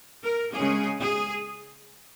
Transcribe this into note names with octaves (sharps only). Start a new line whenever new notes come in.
A#4
C#3 G#3 C#4 G#4
G#4